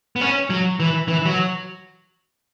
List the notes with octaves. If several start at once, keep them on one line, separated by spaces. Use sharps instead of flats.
B3
C#4
F#3
E3
E3
F#3